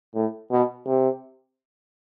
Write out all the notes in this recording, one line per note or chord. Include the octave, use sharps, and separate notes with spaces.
A2
B2
C3